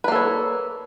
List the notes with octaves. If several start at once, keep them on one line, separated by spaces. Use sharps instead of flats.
A#3 A4 B4 C#5